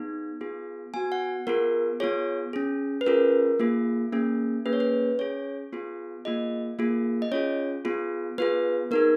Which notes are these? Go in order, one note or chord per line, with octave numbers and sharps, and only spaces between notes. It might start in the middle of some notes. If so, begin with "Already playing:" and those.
Already playing: B3 D#4 G#4
B3 F4 G#4
B3 F#4 G#5
F#5
B3 F4 G#4 A#4
B3 F4 G#4 C#5
C#4 G#4
B4
C#4 F4 G#4 A#4
A#3 F4 G#4
A#3 C#4 G#4
A#3 C#4 G#4 B4
C#5
B4
C#4 G#4 C#5
B3 F4 G#4
A#3 F4 G#4 D#5
A#3 F4 G#4
D#5
C#4 F4 G#4 C#5
B3 F4 G#4
B3 F4 G#4 B4
B3 D#4 G#4 A#4